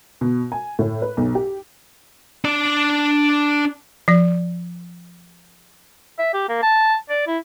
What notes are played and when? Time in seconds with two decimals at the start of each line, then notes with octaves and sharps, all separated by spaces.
0.21 B2
0.52 G#5
0.79 A2
1.02 B4
1.17 B1
1.35 G4
2.44 D4 D5
4.08 F3 D5
6.19 E5
6.34 G4
6.49 A#3
6.63 A5
7.10 D5
7.27 E4